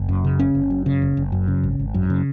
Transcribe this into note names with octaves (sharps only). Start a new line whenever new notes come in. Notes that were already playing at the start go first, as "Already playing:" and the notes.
Already playing: F#1
F#2
C#3
F#1 C#4
F#1
F#2
C#3
F#1
F#1
F#2
C#3
G#1
G#1
F#2
C#3